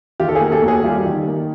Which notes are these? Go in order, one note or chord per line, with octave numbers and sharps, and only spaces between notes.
D#3 F4 G4
A4
F#4 G#4
A#3
G4 A4
D#2
F#4 G#4
G3 F4 G4
D#3
A#3